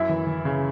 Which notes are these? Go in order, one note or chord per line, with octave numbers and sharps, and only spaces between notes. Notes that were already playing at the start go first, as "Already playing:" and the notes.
Already playing: F#2 E4 E5
E3
E3
C#3